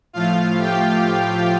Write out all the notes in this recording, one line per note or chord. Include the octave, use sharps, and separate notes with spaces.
A2 F3 A3 F4 F5
G4 G5